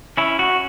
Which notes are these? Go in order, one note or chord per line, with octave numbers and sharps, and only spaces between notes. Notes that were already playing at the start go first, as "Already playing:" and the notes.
C#4 E4
F#4
C#4